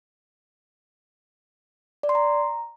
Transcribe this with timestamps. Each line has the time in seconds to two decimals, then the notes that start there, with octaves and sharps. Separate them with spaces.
2.03 D5
2.09 C6
2.15 A#5